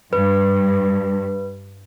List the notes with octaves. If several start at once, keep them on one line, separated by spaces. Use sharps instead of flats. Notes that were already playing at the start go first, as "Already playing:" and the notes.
G2 B4